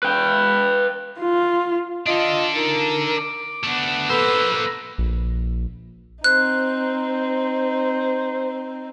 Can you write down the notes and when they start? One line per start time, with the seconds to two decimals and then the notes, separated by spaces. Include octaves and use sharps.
0.03 B4 G5
1.20 F4
2.07 D4 F4 A4 D#5
2.56 D#4 A#4
3.17 D6
3.63 A3 B3 D4
4.09 A#3 A4 B4 C5 E6
4.98 A#1
6.24 C4 D#4 C5 F#6